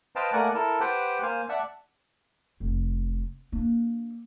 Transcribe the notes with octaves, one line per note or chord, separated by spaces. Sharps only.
B4 C5 D#5 F5 G5 A5
A3 A#3 A#4 D5 F#5 G#5
E4 A4 A#4 A5
G4 B4 C5 F#5 G5
A#3 C5 F5 G#5
D5 E5 F#5 A5 E6
F1
A#3 D4